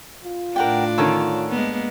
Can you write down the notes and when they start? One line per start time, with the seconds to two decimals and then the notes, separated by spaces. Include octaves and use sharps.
0.24 F4
0.56 A2 D4 A#4 F#5 G5
0.98 D3 D#3 C#4 A4 C#5
1.49 G#3 A#3 B3